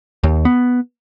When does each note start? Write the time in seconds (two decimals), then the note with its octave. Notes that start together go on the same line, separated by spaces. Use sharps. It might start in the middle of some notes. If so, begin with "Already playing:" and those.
0.23 D#2
0.45 B3